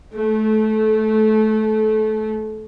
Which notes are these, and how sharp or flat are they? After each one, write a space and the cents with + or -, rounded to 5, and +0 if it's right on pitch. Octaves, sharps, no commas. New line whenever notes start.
A3 -20